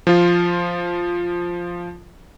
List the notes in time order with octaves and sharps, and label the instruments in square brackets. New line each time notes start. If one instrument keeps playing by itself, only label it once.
[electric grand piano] F3 F4